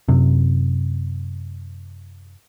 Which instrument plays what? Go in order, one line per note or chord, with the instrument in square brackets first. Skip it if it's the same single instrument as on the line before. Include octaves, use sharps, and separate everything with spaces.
[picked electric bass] F#2 C3